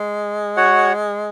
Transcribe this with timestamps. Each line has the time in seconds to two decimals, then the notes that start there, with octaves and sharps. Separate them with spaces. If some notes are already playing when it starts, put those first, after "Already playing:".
Already playing: G#3
0.57 F#4 C#5 F#5